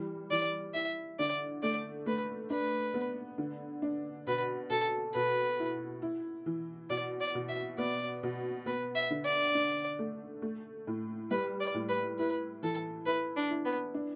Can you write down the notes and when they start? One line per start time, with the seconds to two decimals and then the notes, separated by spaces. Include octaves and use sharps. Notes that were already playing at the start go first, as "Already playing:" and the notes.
Already playing: E3 G3
0.31 E3 D5
0.74 E4 E5
1.19 D3 D5
1.63 A3 D5
2.06 A3 B4
2.50 D4 B4
2.94 B3
3.38 D3
3.82 D4
4.27 B2 B4
4.70 B2 A4
5.14 B2 B4
5.59 E4
6.02 E4
6.46 E3
6.90 B2 D5
7.20 D5
7.35 B2
7.49 E5
7.78 B3 D5
8.23 B2
8.66 B3 B4
8.95 E5
9.10 D3
9.25 D5
9.55 D4
9.99 A3
10.42 A3
10.87 A2
11.31 G3 B4
11.60 D5
11.74 A2
11.89 B4
12.19 E4 B4
12.63 E3 A4
13.06 E4 B4
13.37 D4
13.50 E4
13.65 B3
13.94 D4